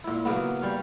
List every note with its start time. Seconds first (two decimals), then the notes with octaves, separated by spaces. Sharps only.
0.04 A#2 E4
0.25 C#3 F#3 A#3 B3
0.61 G3 C#5 F5